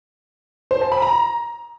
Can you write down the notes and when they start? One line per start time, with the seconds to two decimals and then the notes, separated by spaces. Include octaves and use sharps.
0.71 C5
0.81 A5
0.92 B5
1.02 A#5